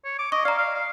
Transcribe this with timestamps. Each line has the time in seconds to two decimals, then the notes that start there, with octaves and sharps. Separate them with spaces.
0.05 C#5
0.19 D6
0.32 D#5 C#6
0.45 D5 F5 A#5
0.58 F5
0.75 F5